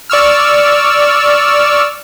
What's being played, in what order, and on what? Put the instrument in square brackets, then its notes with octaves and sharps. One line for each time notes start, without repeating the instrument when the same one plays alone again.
[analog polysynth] D5 C#6 E6 F6